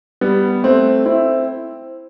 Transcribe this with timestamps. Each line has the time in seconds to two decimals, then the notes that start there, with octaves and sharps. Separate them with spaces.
0.21 G3 B3
0.63 A3 C4
1.05 C4 E4